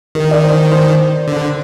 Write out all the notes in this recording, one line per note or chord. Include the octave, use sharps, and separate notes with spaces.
D#3 A#4
D5
C5
C5
D3